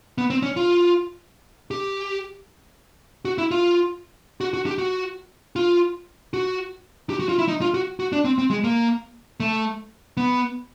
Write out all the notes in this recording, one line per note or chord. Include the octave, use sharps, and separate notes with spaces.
B3
C4
C#4
F4
G4
F#4
E4
F4
F#4
F#4
G4
F#4
F4
F#4
G4
F#4
F4
E4
D#4
F4
F#4
F#4
D4
C4
C4
G#3
A#3
A3
B3